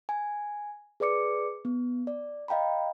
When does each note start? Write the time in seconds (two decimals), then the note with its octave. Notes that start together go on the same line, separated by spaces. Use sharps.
0.09 G#5
1.00 G#4 B4 D5 D6 C#7
1.65 B3
2.07 D5
2.48 D#5 F5 G5 A#5 B5